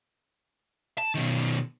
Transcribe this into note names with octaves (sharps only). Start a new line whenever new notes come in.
A5
B2 D#3